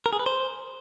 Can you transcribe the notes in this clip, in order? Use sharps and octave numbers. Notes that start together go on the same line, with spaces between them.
A#4
G#4
B4
C5